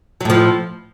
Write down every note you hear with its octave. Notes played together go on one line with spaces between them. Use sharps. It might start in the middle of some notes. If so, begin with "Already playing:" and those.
A2 F3 F#3